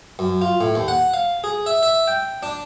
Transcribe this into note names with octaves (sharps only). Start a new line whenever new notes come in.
F#2
F4
A2
D#2
F#5
F5
G#4
E5
E5
G5
D4